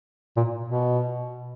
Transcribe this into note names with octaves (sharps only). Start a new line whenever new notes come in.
A#2
B2